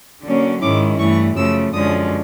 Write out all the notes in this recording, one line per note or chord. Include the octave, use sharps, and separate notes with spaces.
D3 F#3 A#3 C#4
G#2 D#3 G#3 C#4 E4 D6
G2 E3 A3 C#6
F#2 C#3 F3 A3 E6
F#2 D3 F3 G#3 C#4 D#6